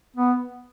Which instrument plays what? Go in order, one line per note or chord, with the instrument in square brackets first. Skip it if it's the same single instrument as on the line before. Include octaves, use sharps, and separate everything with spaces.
[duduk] B3